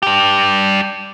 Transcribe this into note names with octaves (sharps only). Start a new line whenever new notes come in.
D4 G4